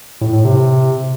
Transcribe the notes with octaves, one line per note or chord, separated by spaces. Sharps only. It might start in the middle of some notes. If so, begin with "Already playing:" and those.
A2
A2
C3